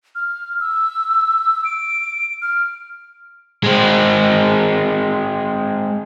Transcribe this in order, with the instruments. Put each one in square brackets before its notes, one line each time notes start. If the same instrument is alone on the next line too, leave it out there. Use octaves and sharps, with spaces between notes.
[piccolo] F6
E6
D7
F6
[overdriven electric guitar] G#3 C4